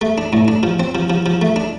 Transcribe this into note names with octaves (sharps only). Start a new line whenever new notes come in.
A3
D4
A2
D4
F3
C4
F3
F3
F3
A3
D4